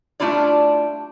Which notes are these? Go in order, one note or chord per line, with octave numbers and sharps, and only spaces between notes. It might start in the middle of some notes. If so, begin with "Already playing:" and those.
G3 A3 D4 E4 F4 D5